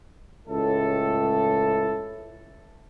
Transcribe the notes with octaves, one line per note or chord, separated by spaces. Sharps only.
C#2 A2 A4